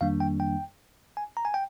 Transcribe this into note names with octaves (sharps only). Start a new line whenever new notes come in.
F2 D#3 G3 A#3 D4 F5
G5
G5
G#5
A#5
G#5
G5